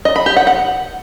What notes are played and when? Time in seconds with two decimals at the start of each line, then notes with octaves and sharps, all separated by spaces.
0.05 D#5
0.16 B5
0.26 G4
0.36 F#5
0.47 F#5